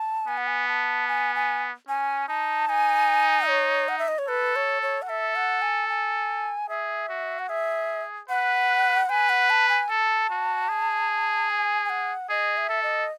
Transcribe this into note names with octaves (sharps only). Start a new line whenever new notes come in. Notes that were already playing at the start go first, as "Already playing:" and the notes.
Already playing: A5
B3 G#5
F#5
G#5
A5
G#5
G#5
C#4 G#5
D#4 A5
D#4 G#5
C#5
F#5
E5
D#5
C#5
A4 B4
C#5
C#5
F#5
A4 E5
F#5
G#5
G#5
G#4 E5
F#4
F#5
G#4 E5
B4 F#5
B4 G#5
F#5
A5
G#5
A4 A5
F#4
G#4
G#5
G#5
F#5
G#4 D#5
E5
A4
D#5